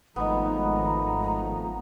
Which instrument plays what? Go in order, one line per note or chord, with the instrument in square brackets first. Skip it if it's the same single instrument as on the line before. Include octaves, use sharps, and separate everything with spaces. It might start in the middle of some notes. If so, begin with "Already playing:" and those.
[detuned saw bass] G#1 [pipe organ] F3 A3 [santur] B3 D#4 [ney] A#5